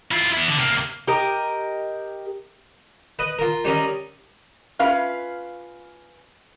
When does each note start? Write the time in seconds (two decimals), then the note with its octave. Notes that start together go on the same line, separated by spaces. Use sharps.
0.11 E4 F4
0.33 B3 E4
0.48 D3
0.59 C3 A#3
1.07 G4 A#4 D#5
3.19 B4 D#5
3.39 F4 A#4
3.65 G3 C#4 A#4 D#5
4.79 C#4 F4 B4 F5